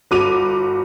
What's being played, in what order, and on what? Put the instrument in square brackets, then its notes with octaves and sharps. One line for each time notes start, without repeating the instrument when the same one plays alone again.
[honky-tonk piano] G1 F#4 D6 D#7 F7